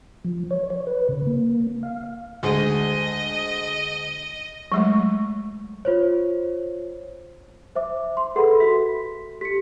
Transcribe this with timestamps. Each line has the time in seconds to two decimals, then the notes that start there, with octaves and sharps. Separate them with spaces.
0.25 F3
0.51 C#5
0.70 C#5
0.87 B4
1.09 C#3
1.27 A#3
1.83 F5
2.43 D2 G#3 D#5
4.72 F#3 G#3 A3
5.85 F4 C5 C#5
7.76 C5 E5 D6
8.17 C6
8.36 G#4 A4 B4 F#5 B5 C6
8.60 F#4 E5 B6
9.41 G4 B6 C#7